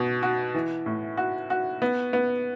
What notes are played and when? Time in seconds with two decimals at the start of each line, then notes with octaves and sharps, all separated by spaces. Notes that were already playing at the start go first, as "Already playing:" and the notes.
Already playing: B2
0.23 F#4
0.55 E3
0.86 A2
1.17 F#4
1.50 F#4
1.82 B3
2.13 B3